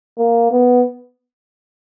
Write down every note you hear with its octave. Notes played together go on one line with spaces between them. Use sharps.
A#3
B3